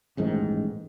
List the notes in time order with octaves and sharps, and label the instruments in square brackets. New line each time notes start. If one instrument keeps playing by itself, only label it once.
[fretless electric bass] D#1 A1 G#2 D#3